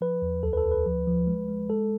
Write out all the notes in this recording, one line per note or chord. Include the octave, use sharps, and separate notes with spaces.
F3 B4
E2
D2 A4
B4
A4
D2
B4
F3
F3
G#3
G#3
G#3 A4